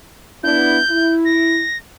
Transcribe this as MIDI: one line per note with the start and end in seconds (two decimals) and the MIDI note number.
0.43 0.78 59
0.43 0.78 62
0.43 0.78 64
0.43 1.13 91
0.90 1.63 64
1.25 1.77 94